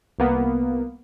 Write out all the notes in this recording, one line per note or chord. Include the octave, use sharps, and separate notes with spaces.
C2 A#3 B3